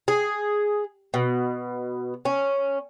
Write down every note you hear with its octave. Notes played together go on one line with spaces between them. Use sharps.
G#4
B2
C#4